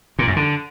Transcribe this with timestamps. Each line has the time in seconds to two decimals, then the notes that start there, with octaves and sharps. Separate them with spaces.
0.19 A#2
0.27 F#2
0.36 D3